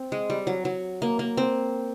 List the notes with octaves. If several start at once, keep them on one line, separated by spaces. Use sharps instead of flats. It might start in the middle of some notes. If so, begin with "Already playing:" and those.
Already playing: C4
G#3
G3
F#3
F#3
A#3
A#3
C4